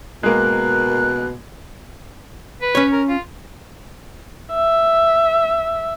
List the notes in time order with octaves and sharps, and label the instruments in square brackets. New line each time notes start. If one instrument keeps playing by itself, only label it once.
[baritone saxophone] B2 [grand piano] G#3 A#3 [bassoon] A#4 [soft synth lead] F#6
[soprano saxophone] B4
[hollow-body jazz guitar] C#4 C#5
[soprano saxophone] A#4
F4
[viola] E5